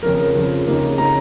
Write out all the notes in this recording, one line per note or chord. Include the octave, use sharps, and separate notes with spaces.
F2 C#3 F3 A#4
A#4
F2 C#3 F3
F2 C#3 A#3 D#4
C#3 A#3 D#4 A#5